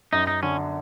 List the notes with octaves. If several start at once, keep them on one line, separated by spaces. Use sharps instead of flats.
F#2 D#4
D#4
D3 C#4